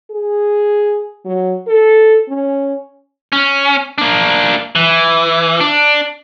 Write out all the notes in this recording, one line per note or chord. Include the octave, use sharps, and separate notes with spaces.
G#4
F#3
A4
C#4
C#4
A#3 D4
E3
D4